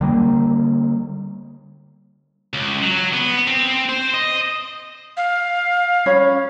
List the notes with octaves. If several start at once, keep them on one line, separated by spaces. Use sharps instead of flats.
D3 G3 A#3
C#2
F#3
B3
C4
C5
D#5
F5
C#4 C#5 B5